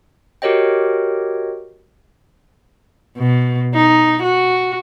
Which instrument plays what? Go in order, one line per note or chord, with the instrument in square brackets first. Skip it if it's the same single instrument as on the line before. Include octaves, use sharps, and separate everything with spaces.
[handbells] F#4 G4 A#4 C#5 D#5 G5
[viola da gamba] B2
D#4
F#4